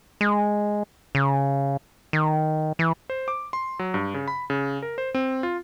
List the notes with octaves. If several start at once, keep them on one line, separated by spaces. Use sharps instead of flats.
G#3
C#3
D#3
E3
C5
D6
C6
F#3
G2
C#3
B5
C#3
A#4
C5
C4
F4